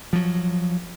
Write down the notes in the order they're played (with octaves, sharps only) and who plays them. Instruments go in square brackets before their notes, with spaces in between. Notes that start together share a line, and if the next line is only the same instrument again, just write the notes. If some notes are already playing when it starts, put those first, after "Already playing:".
[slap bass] F3 F#3